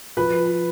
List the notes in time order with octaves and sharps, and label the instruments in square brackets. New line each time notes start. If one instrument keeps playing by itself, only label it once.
[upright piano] F3 B4